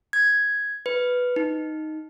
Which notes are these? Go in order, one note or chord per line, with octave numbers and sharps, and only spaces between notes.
G#6
B4
D#4